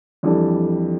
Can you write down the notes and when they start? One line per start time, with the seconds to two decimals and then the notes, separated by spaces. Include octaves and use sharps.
0.23 F2 E3 G3 D4 A4